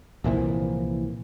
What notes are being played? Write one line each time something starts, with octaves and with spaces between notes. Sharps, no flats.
C2 A#2 E3 F3